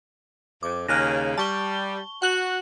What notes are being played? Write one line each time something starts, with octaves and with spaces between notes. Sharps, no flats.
F2 D6
D#2 C#3 F6 F#6 A#6
G3 A5 C#6 G7
F#4 F#5 F#6 F#7